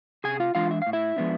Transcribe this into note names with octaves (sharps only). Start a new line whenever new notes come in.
C3 G#4 G#5
F4 F5
E3 G#3 D4 F4 F5
E5
A2 F5
E4 E5
F3 G#3 B3 D4